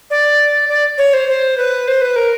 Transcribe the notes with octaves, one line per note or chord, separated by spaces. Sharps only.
D5
D5
C#5
C5
C5
B4
C5
B4
A#4